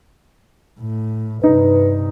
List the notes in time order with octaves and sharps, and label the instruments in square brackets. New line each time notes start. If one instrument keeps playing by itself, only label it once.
[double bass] A2
[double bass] G2 C3 [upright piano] D#4 [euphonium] B4